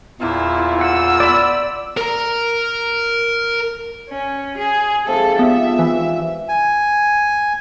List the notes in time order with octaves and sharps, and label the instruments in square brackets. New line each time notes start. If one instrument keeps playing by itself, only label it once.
[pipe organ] E2 A#2 F4 [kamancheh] E4
[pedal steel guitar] F#5 [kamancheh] E6
[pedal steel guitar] D5 B5
[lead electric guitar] A#4 A#5
[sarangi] C#4
G#4
[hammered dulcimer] G#2 C3 F3 [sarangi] A4
[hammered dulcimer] C3 D4 F4 [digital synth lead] B3 [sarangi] E5
[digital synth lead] E3
[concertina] G#5